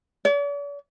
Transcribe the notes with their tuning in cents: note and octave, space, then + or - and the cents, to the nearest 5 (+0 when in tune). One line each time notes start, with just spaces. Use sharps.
D5 -45